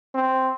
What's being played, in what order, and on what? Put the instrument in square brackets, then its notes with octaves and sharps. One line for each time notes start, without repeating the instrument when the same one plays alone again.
[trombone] C4